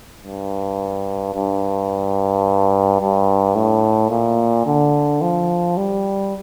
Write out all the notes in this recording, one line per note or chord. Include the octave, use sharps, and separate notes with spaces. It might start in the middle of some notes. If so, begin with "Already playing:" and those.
G2
G2
G2
A2
A#2
D3
F3
G3